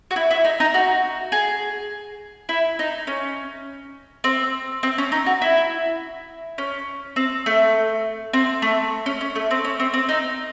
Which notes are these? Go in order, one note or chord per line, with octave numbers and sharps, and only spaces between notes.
F#4
E4
E4
D#4
D#4
F#4
G#4
E4
D#4
C#4
C4
C4
C#4
D#4
F#4
E4
C#4
C4
A3
C4
A3
C#4
C#4
A3
C4
C#4
C4
C4
D#4